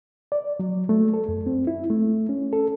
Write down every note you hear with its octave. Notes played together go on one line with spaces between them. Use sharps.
D5
F#3
A3
A4
F#2
C4
E4
A3
C#4
A4